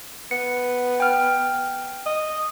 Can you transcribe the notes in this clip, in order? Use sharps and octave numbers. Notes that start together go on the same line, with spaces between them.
B3 C#7
G5 F6
D#5